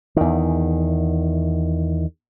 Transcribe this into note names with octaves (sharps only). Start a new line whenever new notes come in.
E2 D#3